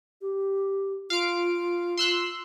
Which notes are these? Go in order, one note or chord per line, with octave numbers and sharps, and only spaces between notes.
G4
F4 F5 D7
C6 E6 F#6